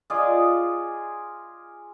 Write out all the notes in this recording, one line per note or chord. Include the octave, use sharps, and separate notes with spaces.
F4 G#4 D5 D#5